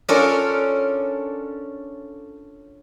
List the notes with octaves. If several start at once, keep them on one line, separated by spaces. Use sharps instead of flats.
C#4 D4 F4 A4 A#4